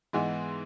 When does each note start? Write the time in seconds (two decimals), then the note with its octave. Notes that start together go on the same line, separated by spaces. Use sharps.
0.13 G#2 E3 G#3 B3 D#4